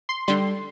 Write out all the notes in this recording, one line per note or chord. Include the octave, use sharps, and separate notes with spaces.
C6
D3 G3 C6